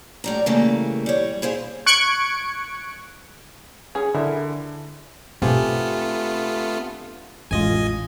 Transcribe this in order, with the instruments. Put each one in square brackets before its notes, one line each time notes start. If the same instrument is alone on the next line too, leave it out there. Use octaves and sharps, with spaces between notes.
[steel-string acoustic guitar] A2 G3 A#5
C#3 E3 G3 A3 A#3
G3 C#5
E4 G#4 C5 F5
[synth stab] C#6 F#6 G#6 C#7 D7
[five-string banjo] C#4 G#4
[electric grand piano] D3 [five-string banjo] E4 A#4 E5
[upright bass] B2 D4 [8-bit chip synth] A3 B3 F4 [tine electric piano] C4 G4 G#5
[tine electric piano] A1 F4 [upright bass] F2 G#3 [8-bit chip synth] D#5 G#5